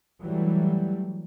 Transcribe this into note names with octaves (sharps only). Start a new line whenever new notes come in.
E3 F#3 G3 A3